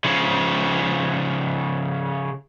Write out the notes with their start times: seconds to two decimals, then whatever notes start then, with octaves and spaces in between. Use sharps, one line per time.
0.05 C#3 F3